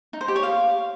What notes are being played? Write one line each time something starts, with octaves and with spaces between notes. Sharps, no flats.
D#4
C5
G4
C#5
F5